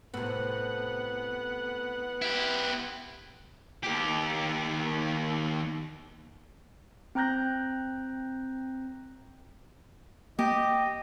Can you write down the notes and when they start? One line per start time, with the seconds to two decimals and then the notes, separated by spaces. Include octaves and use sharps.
0.14 A2 C3 B3 F#5
2.22 E4 G4
3.83 D#2 G4
7.15 C4 G5 A#5 F#6 G6 A#6
10.39 A#3 G4 D#5